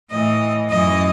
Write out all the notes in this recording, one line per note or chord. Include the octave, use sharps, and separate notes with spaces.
A2 E3 D#5
F#2 E3 D#5